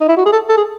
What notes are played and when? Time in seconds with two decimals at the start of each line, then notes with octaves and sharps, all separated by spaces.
0.01 D#4
0.08 E4
0.17 F#4
0.25 G#4
0.33 A4
0.49 A4
0.57 G#4